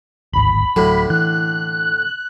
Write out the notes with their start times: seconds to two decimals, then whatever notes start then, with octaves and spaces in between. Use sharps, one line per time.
0.33 D1 G#1 D#2 B5
0.76 D1 A2 D3 F#3
1.10 E3 F#6